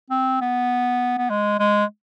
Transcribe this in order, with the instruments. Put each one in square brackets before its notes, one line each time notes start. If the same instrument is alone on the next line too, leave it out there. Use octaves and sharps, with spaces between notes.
[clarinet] C4
B3
B3
G#3
G#3